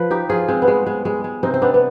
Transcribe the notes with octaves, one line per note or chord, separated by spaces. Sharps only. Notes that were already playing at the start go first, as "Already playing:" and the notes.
Already playing: F3 B4
D#4 G4
F3 F4 G#4
G#3 C4
B3
G3 G#3
G#3
G3 G#3
G#3
C3 C4 D#4
C4
B3 D4
B3